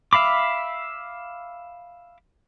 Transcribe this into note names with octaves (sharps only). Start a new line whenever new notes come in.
E5 F5 B5 D6